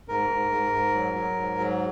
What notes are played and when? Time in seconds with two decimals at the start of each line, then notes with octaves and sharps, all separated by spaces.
0.08 G#2 A#4
0.30 G#2
0.51 G#2
0.72 G#2
0.95 F#3
1.15 F#3
1.37 G#2
1.59 F#3